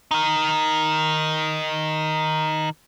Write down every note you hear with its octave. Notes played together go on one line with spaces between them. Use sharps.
D#3 D#4